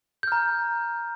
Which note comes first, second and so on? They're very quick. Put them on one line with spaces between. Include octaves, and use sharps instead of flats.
G6 F6 A#5